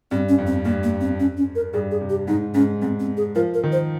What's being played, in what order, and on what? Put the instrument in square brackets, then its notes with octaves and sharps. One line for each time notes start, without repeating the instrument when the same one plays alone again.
[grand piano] G2 [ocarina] C4
[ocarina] C#4
[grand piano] F2
[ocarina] C4
[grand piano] G2 [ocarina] A#3
[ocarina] A#3
C4
C#4
C#4
A#4
[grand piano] G2 [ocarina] G#4
[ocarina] G#4
[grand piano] C3
[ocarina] G4
[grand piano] G#2 [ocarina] D#4
[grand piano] G#2 [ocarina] C#4
[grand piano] G#2 [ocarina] C4
[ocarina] C4
G#4
[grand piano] F3 [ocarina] A#4
[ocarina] A#4
[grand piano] D#3
[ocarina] C5